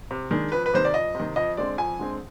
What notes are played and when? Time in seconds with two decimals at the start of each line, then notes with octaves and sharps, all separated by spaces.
0.11 C3
0.31 D#3 G#3 D4
0.52 F2 B4
0.66 B4
0.73 C3 D#3 C5
0.85 D5
0.94 F2 D#5
1.15 C3 D#3
1.36 F2 D#5
1.57 D3 G#3 C4 D5
1.78 F2 G#5
1.99 D3 G#3 C4